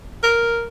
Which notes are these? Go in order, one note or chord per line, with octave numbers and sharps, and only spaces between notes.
A#4